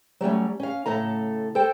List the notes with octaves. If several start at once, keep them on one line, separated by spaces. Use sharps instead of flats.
F#3 G3 A3 C#4
C#4 F5
A2 C#3 A3 A4 A#5
A4 C5 G5